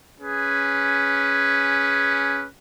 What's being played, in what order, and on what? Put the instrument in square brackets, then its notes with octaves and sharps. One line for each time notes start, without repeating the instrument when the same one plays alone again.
[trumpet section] C#4 G#4 B4